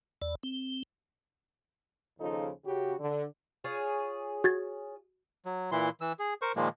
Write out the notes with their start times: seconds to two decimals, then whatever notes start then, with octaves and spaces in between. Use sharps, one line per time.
0.22 E2 D5
0.43 C4
2.19 D#2 C#3 F3 D#4 F4 A4
2.65 C#3 F#4 G4
2.99 D3
3.64 F4 G#4 C#5
4.44 F#4 G#6 A6
5.45 F#3
5.72 A#2 E3 E4 C6
6.01 E3 E6
6.19 G#4
6.42 A#4 C5 C#6
6.56 A#2 D#3 F3 G#3 A#3